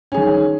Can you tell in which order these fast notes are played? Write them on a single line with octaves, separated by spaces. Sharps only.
C#4 G#4 D#3